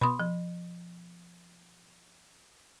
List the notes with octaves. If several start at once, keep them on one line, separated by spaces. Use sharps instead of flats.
B2 B3 B5 C6 D#6
F3